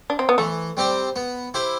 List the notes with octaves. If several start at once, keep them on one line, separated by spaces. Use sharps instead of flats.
D4
C4
B3
E3 A3
G3 C4 G4 C5
B3
E4 G4 C5